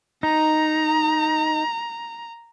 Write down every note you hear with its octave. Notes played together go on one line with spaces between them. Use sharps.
D#4 A#5